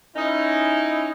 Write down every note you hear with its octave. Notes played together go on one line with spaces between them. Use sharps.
C#4 D#4 E4